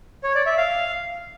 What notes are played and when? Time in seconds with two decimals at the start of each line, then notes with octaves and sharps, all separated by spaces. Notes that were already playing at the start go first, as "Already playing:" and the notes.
0.24 C#5
0.35 D5
0.46 E5
0.58 F5